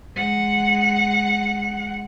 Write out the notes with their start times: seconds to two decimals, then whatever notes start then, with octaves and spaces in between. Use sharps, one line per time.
0.16 G#3 F#5